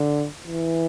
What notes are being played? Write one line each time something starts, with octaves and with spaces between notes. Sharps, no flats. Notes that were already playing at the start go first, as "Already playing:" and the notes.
Already playing: D3
E3